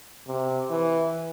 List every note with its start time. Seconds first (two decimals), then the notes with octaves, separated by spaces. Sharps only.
0.27 C3
0.70 E3